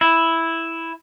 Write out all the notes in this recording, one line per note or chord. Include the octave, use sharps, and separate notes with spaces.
E4